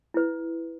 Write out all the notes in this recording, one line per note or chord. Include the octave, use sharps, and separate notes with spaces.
E4 B4